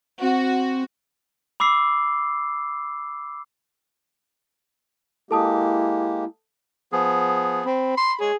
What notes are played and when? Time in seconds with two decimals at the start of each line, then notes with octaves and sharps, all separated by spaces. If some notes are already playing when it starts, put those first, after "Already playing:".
0.21 C4 F#4
1.60 B5 D6 E6 C7
5.31 G#3 A#3 E4 G4 A4 A5 D#6
6.92 F3 B3 G#4
7.66 C4 B5
7.97 C6
8.20 G#3 G#4 C#5